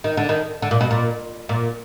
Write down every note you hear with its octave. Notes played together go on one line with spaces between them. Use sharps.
D#3
D3
D#3
D3
A#2
B2
A#2
A#2